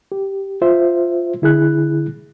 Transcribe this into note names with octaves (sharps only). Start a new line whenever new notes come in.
G4
F4 C5 E5
D3 E4 G#4 F#6